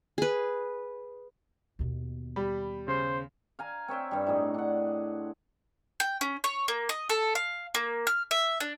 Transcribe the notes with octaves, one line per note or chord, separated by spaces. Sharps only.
G#4 B4
D#2 B2
G3 B5
C#3 C5
F5 G#5 A#5
C4 C#5 E5 G5
G2 G3
A2 D#4 G#4
D4 F#5
G5
C#4
C#5
A#3
D#5
A4
F5
A#3
F6
E5
D4